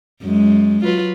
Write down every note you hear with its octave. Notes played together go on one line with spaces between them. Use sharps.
F#2 G#3
F#3 F4 B4